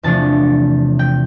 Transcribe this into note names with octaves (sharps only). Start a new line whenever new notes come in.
E2 C3 F3 A3 D4 A5
G5